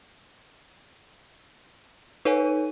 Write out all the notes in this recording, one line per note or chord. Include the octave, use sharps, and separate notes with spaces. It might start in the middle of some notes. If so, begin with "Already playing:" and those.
D#4 A4 B4 C#5 G#5 D#7